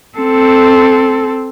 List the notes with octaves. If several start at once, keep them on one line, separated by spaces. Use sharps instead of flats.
C4 A4